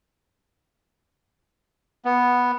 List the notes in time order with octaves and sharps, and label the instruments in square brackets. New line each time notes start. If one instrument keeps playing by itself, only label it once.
[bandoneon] B3